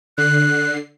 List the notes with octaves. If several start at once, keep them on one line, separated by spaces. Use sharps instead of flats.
D3 F#6 C7